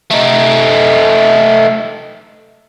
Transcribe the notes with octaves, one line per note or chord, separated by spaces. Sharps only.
A3 D#4